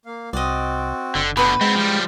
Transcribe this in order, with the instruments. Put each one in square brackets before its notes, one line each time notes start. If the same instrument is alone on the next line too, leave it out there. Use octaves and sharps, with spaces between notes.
[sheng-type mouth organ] A#3 F5
[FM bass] C2 [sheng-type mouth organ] C4 F#4 [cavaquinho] D5 D#5
[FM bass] F#1 [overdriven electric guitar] D3
[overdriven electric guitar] B2 D3 [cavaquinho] F#4 B4 B5 [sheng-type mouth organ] D#6 G6
[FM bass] G#3 [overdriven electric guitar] B3 C4 [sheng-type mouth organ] G5
[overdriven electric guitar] F3 G3